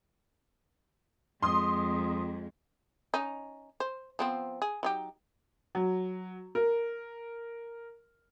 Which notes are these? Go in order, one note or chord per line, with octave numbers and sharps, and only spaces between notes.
F2 G#3 C6 D#6
C#4 D#4
C5
F3 B3 C4
G#4
F#3 D#4 G4
F#3
A#4